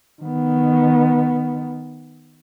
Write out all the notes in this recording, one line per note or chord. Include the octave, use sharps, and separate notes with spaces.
D#3 B3